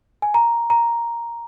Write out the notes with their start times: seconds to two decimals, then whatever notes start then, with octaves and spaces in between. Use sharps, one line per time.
0.22 G#5
0.34 A#5
0.70 A#5